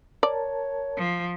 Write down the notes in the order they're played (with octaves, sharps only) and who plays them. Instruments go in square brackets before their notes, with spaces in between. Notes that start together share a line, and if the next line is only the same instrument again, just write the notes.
[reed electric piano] A#4 A5 [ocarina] C#5 [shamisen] D5
[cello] F3